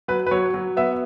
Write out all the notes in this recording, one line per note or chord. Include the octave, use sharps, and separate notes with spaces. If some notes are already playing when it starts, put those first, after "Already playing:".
F#3 B4
B4
F#3 C#5
F#3
B3 E5